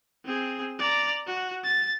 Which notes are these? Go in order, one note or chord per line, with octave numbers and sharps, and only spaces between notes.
C4 G#4
D5 A#5
F#4
A6